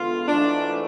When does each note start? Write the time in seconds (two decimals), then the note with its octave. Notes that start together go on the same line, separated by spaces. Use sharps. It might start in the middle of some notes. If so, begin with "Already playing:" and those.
Already playing: E2 D3 G#3 B3 F4
0.27 G#2 E3 A3 D4 E4